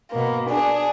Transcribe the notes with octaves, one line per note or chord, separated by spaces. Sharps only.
B2 A#3
D4 G#4